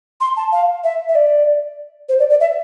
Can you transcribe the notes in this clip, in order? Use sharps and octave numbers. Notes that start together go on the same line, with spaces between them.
C6
A5
F5
E5
E5
D5
C5
D5
D5
E5